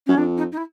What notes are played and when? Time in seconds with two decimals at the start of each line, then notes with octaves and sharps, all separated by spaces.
0.06 F#2 C#4
0.17 F2 D4
0.37 D#4
0.52 D#4
0.57 E4